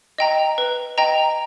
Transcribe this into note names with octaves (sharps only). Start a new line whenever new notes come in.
D#5 G5 A#5
B4
D#5 G5 A#5